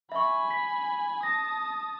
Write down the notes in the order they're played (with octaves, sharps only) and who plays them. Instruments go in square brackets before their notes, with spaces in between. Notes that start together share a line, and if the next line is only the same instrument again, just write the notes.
[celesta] E5 C#6 [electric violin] G#5 B5
[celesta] B6
[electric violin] A5 D#6 [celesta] A#6